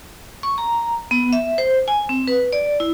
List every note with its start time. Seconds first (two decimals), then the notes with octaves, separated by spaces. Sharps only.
0.43 C#6
0.58 A#5
1.11 B3
1.33 E5
1.58 C5
1.88 G#5
2.09 C4
2.28 B4
2.53 D5
2.80 E4